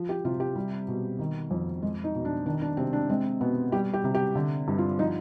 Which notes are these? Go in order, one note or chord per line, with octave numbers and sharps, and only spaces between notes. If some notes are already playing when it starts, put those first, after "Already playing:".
Already playing: F3
G4
C3 F4
G4
G3
B2
D#3
F2
G#3
D#4
B2
D4
D#3 D4
D4
C3 C4
D4
G#3 C4
B2 B3
G3 G4
G4
C3
G4
D3
G2
F4
F3 D#4